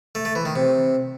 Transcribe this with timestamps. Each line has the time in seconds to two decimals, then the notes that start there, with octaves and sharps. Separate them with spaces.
0.15 A3
0.25 A3
0.35 E3
0.45 D#3
0.56 C3